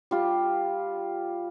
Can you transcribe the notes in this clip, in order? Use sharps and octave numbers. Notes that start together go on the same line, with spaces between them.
G3 F4